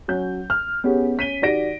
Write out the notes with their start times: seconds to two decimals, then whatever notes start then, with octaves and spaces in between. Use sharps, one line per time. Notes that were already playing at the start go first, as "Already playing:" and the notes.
0.08 F#3 C#4 G6
0.50 F6
0.84 B3 C#4 G4 G#4
1.17 C#4 B6 D#7 G7
1.42 D#3 F#4 G4 D5 A#6 D7